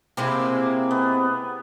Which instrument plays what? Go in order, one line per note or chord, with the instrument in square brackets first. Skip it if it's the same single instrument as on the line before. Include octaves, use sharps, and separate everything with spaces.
[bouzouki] C3 G#3 C4 [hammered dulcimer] A#3 E4
[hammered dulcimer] B3